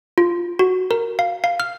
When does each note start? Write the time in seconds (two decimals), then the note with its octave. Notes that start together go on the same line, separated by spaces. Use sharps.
0.18 F4
0.59 F#4
0.91 A#4
1.19 F5
1.44 F5
1.60 F6